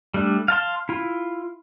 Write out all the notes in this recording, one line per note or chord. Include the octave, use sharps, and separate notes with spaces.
G3 A3 D4
F5 A5 C6
E4 F4